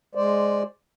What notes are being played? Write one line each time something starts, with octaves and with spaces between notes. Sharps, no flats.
G#3 C5 D5